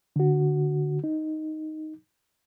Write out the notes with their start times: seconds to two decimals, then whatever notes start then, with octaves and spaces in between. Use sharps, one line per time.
0.16 D3 F#4
1.04 D#4